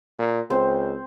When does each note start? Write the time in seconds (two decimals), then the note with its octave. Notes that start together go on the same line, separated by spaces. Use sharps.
0.19 A#2
0.50 C#2 C4 C5